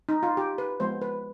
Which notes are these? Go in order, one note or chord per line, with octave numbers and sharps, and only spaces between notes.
D#4
F4
G4
B4
F3 G#3 B3 C5
B4